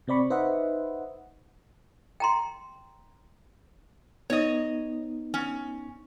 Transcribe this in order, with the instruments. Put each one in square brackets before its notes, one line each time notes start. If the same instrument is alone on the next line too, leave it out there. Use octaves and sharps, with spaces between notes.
[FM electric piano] C3 C4 D5 B5 C#6
D#4 B4 C5 D#5 E5 F#5
[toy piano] G5 A#5 C6
[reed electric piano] B3 D#4 [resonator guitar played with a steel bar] C#5 D#5
[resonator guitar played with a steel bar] C#4